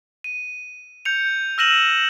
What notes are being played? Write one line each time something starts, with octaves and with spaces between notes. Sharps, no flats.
D#7
G6 C#7 F7
E6 F6 A#6 D#7 E7 F#7